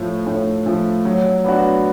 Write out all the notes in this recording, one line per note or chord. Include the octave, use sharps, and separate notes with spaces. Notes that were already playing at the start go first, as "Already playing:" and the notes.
Already playing: A2 F3 A3
A2
F3 A3
F#3
B3 D4 F#4